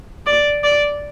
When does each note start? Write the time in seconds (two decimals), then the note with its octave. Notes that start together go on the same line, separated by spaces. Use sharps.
0.27 D5
0.64 D5